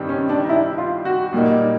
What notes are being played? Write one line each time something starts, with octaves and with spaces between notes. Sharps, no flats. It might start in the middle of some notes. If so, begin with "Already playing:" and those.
Already playing: G2 D#3 G3 C4
C#4
D4
D#4
E4
F4
F#4
A#2 G3 A#3 D#4